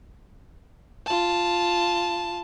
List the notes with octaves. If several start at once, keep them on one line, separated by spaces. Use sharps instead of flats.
F4 A5